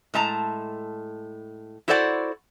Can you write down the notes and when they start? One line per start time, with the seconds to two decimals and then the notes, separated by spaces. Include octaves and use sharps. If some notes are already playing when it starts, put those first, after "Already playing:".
0.14 A2 G#3 A5 A#5
1.88 E4 F#4 A4 C5 D5 F#5